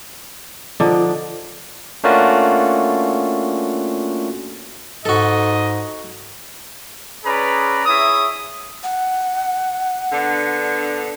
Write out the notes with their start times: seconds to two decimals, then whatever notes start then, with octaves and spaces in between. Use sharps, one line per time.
0.80 D3 F3 D4 D#4
2.04 A3 A#3 C#4 D4 F4 F#4
5.05 G#2 F#4 A4 D#5
7.24 C#4 G#4 B4 D5 A#5 B5
7.86 E4 G#4 C#5 E5 D#6
8.83 F#5
10.12 D3 B3 D4